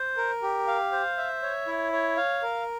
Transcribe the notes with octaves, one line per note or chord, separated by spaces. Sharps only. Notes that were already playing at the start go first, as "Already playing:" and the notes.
Already playing: C5
A#4
G4
F5
C5
E5
C#5
E4
C#5
F5
A#4